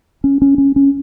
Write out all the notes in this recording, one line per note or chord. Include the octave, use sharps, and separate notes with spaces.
C#4
C#4
C#4
C#4